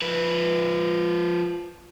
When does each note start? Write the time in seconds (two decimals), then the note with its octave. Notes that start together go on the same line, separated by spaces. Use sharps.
0.02 F3 B4